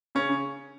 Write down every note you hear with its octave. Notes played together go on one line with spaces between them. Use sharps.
C#3 C#4
C#3